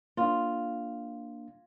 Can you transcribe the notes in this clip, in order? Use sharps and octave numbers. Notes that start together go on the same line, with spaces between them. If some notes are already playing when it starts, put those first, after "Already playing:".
A#3 D4 F4